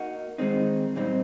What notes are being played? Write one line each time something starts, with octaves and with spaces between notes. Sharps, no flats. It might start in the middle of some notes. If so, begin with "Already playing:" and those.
Already playing: A#3 D#4 F#4
D#3 G#3 C4 D#4
A#2 G3 C4 D#4